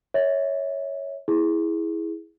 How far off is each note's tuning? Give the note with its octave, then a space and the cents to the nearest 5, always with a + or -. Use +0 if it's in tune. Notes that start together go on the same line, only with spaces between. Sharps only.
C#5 +0 E5 -30
E4 -10 G#4 +0